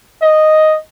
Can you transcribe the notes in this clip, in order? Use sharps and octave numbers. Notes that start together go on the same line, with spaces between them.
D#5